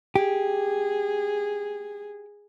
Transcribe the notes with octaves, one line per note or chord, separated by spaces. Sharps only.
G4 G#4